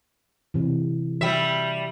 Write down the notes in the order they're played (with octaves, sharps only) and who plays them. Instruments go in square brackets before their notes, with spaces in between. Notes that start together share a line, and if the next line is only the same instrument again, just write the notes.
[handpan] C3 E3
[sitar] G3 E5 [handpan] F#4